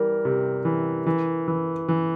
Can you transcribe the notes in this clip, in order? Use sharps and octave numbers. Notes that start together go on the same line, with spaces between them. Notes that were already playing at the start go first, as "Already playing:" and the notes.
Already playing: E3 G3 A#4
C3
E3
E3
E3
E3